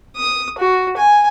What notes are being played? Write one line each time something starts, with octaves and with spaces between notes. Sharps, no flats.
D#6
F#4
G#5